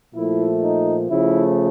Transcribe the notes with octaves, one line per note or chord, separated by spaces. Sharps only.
A#2 F3 A3 E4
D#4
C#3 F3 A3 E4